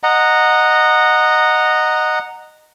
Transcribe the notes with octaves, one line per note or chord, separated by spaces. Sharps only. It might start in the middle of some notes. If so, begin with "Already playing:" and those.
D#5 F#5 A#5